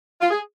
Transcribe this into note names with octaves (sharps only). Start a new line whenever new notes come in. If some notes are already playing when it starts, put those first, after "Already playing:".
F4
G#4